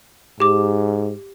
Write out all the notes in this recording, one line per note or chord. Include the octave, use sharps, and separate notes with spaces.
G#2 G4 D6